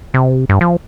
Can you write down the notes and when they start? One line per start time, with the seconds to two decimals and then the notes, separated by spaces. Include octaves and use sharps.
0.14 C3
0.49 G2
0.61 F3